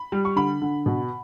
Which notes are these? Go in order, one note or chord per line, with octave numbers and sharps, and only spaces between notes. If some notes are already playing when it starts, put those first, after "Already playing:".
Already playing: B5
G3
C#6
D3 B5
D3
B2